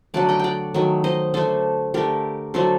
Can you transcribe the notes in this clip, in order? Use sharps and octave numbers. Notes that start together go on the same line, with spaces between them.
D3 F#3 A3 D5 F#5
D#5 G5
D5 F#5 G5
D#3 F#3 A3
C5 D#5
D3 A3 A4 C5
D3 A3 G4 A#4
D3 F#3 A3 A4 C5